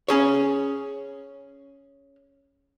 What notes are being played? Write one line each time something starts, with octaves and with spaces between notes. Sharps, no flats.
C#4 G#4 C#5